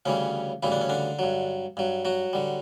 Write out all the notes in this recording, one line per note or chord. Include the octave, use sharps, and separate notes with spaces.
D2 C#3 E3 G3 C#4
D2 C#3 E3 G3 E4
D4
C#4
D3 D4
G2 F#3
G2 F#3
F#3 F#4
D3 G3